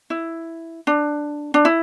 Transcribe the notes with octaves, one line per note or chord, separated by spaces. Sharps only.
E4
D4
D4
E4